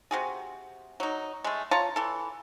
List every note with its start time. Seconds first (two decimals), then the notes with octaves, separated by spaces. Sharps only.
0.11 C3 F#4 G#4
1.00 F#3 D#4
1.44 G#3 A3
1.71 F4 C#5 A5 A#5
1.96 E3 A4